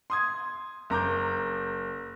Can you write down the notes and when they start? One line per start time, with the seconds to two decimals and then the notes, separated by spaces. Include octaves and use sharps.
0.10 C6 D#6 G#6
0.90 F#1 A#5 D6 G6